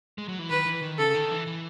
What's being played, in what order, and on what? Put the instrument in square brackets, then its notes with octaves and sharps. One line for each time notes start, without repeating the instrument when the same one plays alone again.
[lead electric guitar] G#3
F#3
E3
[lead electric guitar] D#3 [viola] B4
[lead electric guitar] E3
D#3
[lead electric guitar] C#3 [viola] A4
[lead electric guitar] D#3
E3
E3